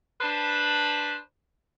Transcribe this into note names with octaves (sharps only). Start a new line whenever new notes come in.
D4 B4 C5 A5 B5